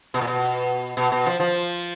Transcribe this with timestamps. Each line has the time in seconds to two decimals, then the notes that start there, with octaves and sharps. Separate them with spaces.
0.14 B2
0.21 A#2
0.27 B2
0.97 B2
1.12 B2
1.26 F3
1.40 F3